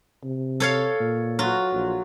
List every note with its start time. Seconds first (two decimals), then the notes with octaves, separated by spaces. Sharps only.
0.24 C3
0.60 A4 C#5 F5
1.01 A#2
1.39 F#3 F4 F#4
1.73 A#1